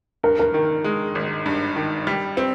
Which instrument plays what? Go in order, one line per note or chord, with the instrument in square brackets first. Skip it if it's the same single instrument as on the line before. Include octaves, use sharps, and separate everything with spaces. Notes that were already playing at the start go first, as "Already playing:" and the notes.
[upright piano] G2 [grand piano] A#4
[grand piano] A#4
[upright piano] D#3
G#3
G#1
G2
D#3
G3
C4